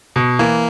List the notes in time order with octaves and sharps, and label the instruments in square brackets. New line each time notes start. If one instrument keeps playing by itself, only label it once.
[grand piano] B2
[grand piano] E3 [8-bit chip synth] A#3